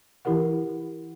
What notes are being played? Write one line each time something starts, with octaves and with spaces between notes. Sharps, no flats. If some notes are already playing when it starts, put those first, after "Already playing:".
E3 E4 G4 A#4 F#5